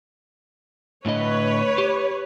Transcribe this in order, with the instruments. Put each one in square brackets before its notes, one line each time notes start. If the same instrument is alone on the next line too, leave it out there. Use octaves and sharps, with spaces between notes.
[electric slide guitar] A2 D3 D#5 [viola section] B4 C#5
[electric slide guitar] G4